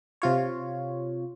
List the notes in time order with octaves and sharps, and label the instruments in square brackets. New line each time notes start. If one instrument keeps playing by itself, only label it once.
[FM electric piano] C3 F4 C#5